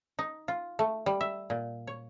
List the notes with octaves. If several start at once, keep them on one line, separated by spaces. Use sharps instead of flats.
D#4
F4
A3
G3
E5
A#2
C#5